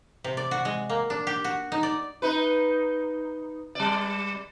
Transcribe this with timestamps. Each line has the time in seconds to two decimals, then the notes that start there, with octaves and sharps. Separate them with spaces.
0.24 C3
0.37 D5
0.51 F#4
0.65 G#3
0.90 A#3
1.10 D4
1.27 G4
1.44 F#4
1.72 D#4
1.83 D5
2.22 D#4 B4
3.75 G3 D5